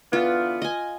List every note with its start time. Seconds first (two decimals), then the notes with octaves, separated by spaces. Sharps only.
0.13 D3 E3 B3 F4
0.62 D#5 G#5